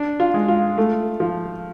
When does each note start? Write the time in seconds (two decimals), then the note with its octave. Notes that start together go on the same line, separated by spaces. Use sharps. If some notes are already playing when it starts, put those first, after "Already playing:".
Already playing: D4
0.20 F4
0.34 G#3
0.48 F4
0.78 A3
1.20 F3